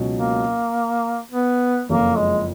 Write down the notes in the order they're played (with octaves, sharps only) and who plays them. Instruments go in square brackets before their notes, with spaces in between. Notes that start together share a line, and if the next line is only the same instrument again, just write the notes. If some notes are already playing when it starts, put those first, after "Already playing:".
Already playing: [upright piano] C#2 B2 F#3 C#4
[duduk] A#3
B3
[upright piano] F#1 F2 F3 [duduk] A#3
[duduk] G#3